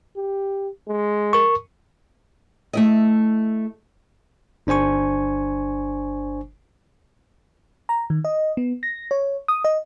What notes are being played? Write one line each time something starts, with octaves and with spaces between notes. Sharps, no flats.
G4
G#3
A#4 C#6
A3 E4 D#5
G1 D4 C5 G#5 C#6
A#5
D#3
D#5
B3
A#6
C#5
D#6
D#5